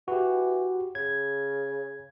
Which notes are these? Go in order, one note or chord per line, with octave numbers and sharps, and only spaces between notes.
E3 F#4 G4
C#3 G#6